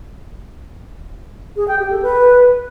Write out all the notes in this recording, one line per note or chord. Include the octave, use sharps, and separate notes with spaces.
G#4
G5
G4
A4
B4